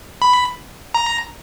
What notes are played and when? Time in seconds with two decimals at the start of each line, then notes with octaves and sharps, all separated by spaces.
0.22 B5
0.94 A#5